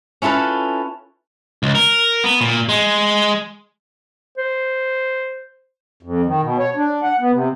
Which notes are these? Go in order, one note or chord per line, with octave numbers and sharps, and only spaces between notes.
C#4 E4 F4 A4 B4
C#2
A#4
B3
A#2
G#3
C5
F2
D#3
B2
C#5
D4
F#5
B3
C3